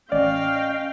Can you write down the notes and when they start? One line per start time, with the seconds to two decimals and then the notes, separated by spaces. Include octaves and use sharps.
0.12 A1 C#4 D5 D#5 F5 G5